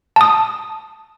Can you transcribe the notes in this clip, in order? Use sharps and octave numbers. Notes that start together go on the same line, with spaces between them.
A5 D#6